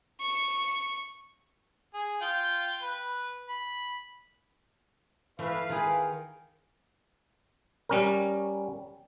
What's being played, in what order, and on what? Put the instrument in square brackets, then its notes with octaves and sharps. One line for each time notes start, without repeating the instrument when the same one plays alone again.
[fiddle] C#6
[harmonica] G#4
F4 G5
B4
B5
[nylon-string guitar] E3 [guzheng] A3 [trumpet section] B4 F5
[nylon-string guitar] D#3 [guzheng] F4 G#4
[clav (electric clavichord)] G3 C#4 A#4